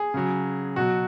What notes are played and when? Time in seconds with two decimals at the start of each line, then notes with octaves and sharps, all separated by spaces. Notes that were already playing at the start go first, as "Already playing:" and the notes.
Already playing: G#4
0.14 C#3 F#3
0.76 B2 F#3 F#4